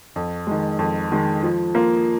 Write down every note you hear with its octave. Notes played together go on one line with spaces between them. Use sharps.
F2
D#3 G#3
F2
D#3 G#3
F3
A#3 F4